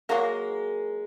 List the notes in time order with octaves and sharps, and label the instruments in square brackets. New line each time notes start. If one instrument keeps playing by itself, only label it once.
[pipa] F#3 A#3 F#4 A#4 [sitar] G#3